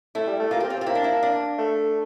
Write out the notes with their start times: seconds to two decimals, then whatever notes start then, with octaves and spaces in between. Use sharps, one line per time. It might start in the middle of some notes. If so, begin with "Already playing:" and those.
0.15 A3 E4
0.27 G3
0.39 A3
0.51 A#3 F4
0.60 C4 G4
0.70 F4
0.75 C4
0.81 F4
0.86 A#3 E4
0.95 D4
1.04 E4
1.23 D4
1.58 A3